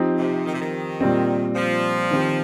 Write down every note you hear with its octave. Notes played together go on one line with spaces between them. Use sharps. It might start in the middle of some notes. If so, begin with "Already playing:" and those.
Already playing: F3 C4 D#4 G4
C3
D#3
C3
D#3
A#2 G3 C4
F3
D#3 C4 G4